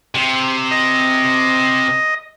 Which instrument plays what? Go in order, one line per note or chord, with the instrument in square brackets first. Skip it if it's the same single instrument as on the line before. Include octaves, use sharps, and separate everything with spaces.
[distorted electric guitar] C3
[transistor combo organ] D#5